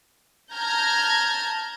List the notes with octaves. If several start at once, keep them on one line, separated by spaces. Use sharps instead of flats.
A5 A#5 F6 G6 G#6 A#6